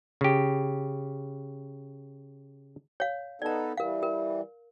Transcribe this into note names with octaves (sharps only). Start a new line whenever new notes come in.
C#3 G4
C#5 F5
B3 D#4 A4 D5 A#5
E3 G3 A#4 F5
A#4